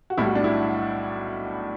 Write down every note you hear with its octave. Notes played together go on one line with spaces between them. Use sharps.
F#4
B1 A2 G3 E4
F#4
D4
E4